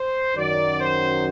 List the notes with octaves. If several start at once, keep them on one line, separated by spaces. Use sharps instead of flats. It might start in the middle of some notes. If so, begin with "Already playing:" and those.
Already playing: C5
F#2 D#3 F#3 D5
C5